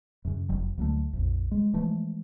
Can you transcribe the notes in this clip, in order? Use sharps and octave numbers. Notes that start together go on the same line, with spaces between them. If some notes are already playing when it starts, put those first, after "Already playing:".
F#2 C#3
F1 F#3
D2 F#3 G3 A3
A#1 F2
G#3
E3 F3 G#3 A3